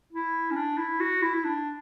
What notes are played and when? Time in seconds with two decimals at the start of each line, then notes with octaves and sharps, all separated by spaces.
0.13 E4
0.51 C#4
0.56 D4
0.78 E4
1.00 F#4
1.22 E4
1.34 E4
1.45 D4